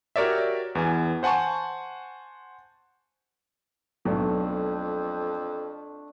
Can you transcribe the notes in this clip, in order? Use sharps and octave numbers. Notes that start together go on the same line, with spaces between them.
F#4 G4 A#4 C#5 D5 E5
E2 E3 G#5
C5 F#5 G#5 A5 C#6
B1 F2 A3 D4